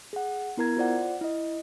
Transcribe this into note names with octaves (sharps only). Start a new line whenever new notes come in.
G#4 F#5
B3 E4 A#4 A#5 G#6
F4 C5 D5 F#5
E4 D#5